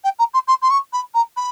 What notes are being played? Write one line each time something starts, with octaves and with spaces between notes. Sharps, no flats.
G5
A#5
C6
C6
C6
C#6
B5
A#5
B5